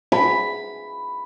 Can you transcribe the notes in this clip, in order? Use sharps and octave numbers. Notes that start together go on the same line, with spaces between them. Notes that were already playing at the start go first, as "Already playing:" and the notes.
B5